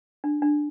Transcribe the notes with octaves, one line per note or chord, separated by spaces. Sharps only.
D4
D4